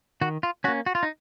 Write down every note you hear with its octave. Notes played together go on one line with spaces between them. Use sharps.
D#3 F#4
F4
A#3 C#4 F#4
F#4
F4
D#4